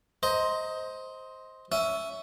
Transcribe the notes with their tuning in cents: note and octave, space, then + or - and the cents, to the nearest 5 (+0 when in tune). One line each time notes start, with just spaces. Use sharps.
C5 +0 D#5 +20 A#5 +0
C#4 +15 E5 +0